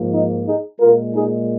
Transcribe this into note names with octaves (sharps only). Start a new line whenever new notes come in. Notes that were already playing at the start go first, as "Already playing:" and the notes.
Already playing: G#2 F3 A#3
D#4
D#4 G#4
A#2 G#3 F4 A#4
D#4 G#4